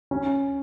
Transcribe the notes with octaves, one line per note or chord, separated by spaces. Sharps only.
C#4